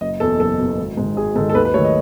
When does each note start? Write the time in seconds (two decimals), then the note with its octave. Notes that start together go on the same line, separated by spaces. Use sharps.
0.01 F#1 D#5
0.20 E2 B2 A4
0.40 F#1 A4
0.59 B2
0.64 E2
0.78 G#1
0.97 G#2 D#3
1.17 G#1 G#4
1.36 G#2 D#3 A4
1.50 A4
1.55 D#2 B4
1.65 B4
1.74 D#3 F#3 A3 C#5
1.84 D#5